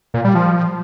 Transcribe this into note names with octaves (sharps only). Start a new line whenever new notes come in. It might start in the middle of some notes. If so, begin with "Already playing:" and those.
A#2
G3
F3